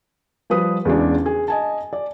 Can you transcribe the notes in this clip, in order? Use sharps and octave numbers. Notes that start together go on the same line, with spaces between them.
F3 G3 B4 D#6
E2 C#3 G#3 D4
G#4
D#5 G#5 A5
D5